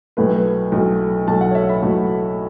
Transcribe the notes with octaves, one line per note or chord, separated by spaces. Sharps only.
B1 A2 F#3 A3 B4
B1 A2 F#3 A3
B1 A2 F#3 A3 A5
F#5
C#5
E5
B5
B1 A2 F#3 A3